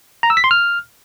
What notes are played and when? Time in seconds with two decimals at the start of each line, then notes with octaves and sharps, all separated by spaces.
0.23 A#5
0.30 E6
0.37 B6
0.44 C6
0.51 F6